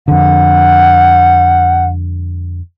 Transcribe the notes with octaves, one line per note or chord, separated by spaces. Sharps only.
F2 D3 F#5